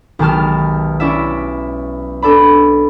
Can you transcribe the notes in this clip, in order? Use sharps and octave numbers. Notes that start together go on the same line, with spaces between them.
B1 D#3 G#3 G4 A5 F6
C#4 E4 D5 E5
D4 A4 D5 B5